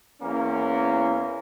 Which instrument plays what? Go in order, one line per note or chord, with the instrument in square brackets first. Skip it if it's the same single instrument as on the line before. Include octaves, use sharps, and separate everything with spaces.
[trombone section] E2 A#3 C#4